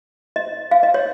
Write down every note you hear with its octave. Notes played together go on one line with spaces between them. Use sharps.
D#5
F5
D#5
C#5